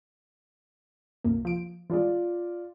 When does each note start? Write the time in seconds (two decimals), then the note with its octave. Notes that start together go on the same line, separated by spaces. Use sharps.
1.24 C2 F#2 A#3
1.45 F3 D7
1.90 E3 G#3 F4 D5